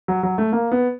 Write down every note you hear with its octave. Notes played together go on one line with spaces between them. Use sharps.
F#3
F#3
A3
A#3
B3